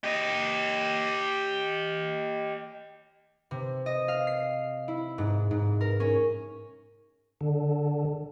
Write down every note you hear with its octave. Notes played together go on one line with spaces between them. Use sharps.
G4 D#5
C3
D#5
F5
C7
E4
G#2
G#2
A#4
C#4
D3